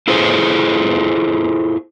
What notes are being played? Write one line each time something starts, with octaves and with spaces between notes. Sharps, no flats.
E4 F4 G#4 A4 C5